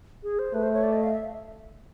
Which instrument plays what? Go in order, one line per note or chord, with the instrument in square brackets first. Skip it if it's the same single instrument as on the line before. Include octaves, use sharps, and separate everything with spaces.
[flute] G#4
C5
[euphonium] A3 [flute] B4
[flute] C5
C#5
D5
D#5
F5
E5